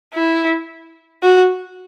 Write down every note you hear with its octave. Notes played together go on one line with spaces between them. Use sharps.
E4
F#4